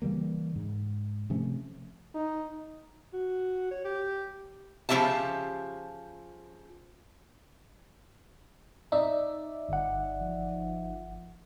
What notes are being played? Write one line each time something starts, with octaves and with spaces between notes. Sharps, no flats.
C#3 E3 G3 A#3
G#2
C3 F3 A3 C#4
D#4
F#4
C#5
G4
C#3 F3 C#4 G4 E5 A5
D#4 D5 E5
G1 F#5
F3